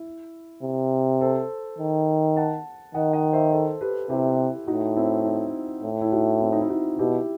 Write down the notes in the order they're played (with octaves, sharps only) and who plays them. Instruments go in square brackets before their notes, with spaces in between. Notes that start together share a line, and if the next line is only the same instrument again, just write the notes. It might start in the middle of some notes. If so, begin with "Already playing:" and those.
Already playing: [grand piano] E4
[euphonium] C3
[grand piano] A4 C5
[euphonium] D#3
[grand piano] F#5 A5
[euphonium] D#3 [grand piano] D#5 F#5
[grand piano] D#5 F#5
C5 E5
A4 C5
G4 B4
[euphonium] C3 [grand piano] E4 G4
[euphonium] A2 [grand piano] D#4 F#4
[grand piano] C4 E4
D#4
[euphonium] A2
[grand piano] E4
D#4 F#4
C4 E4
D#4
E4
D#4 F#4
[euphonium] B2 [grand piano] E4 G4